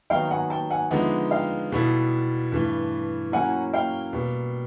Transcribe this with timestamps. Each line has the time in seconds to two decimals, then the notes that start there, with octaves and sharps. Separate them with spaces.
0.10 D#3 F#3 B3 D#4 F5 G5
0.31 F#5 G#5
0.50 G5 A5
0.70 F#5 G#5
0.91 D3 F3 G#3 B3 D#4 E5 F#5
1.31 F5 G5
1.72 B2 G3 B3 E4 A4
2.52 G2 E3 A3
3.32 F#3 A#3 C#4 E4 F#5 G#5
3.73 F5 G5
4.13 B2 G3 A#3